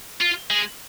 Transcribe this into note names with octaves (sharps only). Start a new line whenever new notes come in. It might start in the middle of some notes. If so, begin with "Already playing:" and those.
F4
G#3